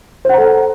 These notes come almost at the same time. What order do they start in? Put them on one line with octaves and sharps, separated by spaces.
C5 F#5 A#5 A4